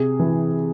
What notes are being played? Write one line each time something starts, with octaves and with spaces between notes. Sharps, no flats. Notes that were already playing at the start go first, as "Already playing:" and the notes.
Already playing: C3 G#4
E3